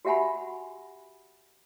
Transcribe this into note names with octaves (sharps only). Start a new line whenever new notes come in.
F#4 G4 E5 F#5 G#5 B5